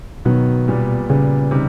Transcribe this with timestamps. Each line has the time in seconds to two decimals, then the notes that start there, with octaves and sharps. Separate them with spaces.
0.25 B2 D#3 F#3 B3
0.68 A#2 G3 B3
1.09 A#2 C#3 G3 B3
1.51 C3 D#3 G3